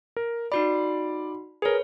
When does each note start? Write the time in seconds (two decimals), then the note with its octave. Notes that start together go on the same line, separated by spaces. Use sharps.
0.17 A#4
0.52 D#4 F#4 D5 B5
1.62 G#4 A#4 B4 C#5